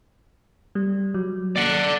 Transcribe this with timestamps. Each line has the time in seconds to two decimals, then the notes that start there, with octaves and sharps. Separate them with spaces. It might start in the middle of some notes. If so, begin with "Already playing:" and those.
0.75 G3
1.14 F#3
1.56 A#3 D5 F#5